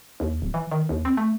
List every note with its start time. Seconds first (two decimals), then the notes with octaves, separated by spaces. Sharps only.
0.20 D#2
0.42 D1
0.54 E3
0.71 D#3
0.89 D#2
1.05 C4
1.17 A3